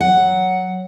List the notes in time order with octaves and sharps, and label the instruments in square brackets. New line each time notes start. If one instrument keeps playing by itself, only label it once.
[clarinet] F#3 [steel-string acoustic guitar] F#5